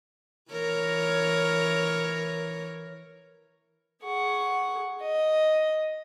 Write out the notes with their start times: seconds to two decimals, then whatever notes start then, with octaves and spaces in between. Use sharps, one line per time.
0.52 E3 A#4 C#5
4.04 G#4 F#5 C#6
5.02 D#5